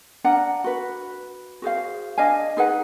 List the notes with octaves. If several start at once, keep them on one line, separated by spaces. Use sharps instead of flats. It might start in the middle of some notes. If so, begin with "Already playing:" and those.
D4 F5 F#5 A#5
F#4 B4
F#4 G#4 C5 F5
D4 D#5 F5 G#5
D#4 G#4 B4 F#5